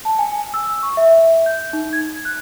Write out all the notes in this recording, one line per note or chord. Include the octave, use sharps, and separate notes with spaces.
A5
G#5
E6
C#6
E5
G6
D#4
G#6
F#6